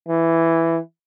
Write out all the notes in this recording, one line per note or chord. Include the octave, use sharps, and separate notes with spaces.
E3